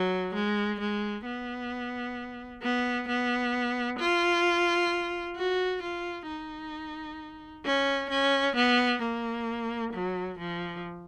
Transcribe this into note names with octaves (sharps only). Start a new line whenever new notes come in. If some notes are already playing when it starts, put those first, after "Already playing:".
Already playing: F#3
G#3
G#3
B3
B3
B3
F4
F#4
F4
D#4
C#4
C#4
B3
A#3
F#3
F3